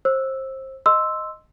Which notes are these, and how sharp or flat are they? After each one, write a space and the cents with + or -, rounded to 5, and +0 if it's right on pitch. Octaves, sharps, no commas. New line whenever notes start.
C5 +25 E6 +0
D#5 +0 C6 +0 E6 +0